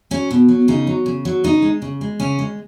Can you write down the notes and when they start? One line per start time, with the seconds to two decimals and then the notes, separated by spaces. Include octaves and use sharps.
0.11 F#3 C#4
0.31 B2
0.49 F#3
0.68 C#3 D#4
0.87 F#3
1.06 C#3
1.25 F#3
1.44 C#3 D#4
1.62 G#3
1.82 C#3
2.01 G#3
2.20 C#3 C#4
2.39 G#3